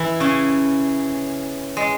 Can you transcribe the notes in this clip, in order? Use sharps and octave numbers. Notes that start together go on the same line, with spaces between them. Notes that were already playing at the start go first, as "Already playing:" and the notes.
Already playing: E3 E4
C#3 C#4
G#3